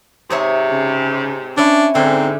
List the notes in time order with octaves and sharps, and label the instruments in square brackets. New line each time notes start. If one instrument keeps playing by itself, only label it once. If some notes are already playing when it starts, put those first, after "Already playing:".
[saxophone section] G#2 C3 [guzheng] G#4 C#5 E5
[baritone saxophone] C#3
[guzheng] C#4 E4 [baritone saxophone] D4
[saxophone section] G#2 [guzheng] D3 [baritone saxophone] C4